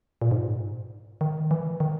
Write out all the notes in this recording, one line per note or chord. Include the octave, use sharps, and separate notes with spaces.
A#2
G#2
D#3
E3
D#3